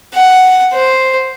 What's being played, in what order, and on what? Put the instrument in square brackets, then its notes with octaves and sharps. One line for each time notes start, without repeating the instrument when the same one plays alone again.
[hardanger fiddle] F#5
C5